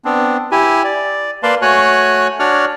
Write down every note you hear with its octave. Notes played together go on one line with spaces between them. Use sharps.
B3 C4 D4
E4 G4 G#5
D5
A#3 B4 D5 F5 A5 C6
A3 F#4 C#5 G#5 F#6
D4 F#4 C#5 D5 F6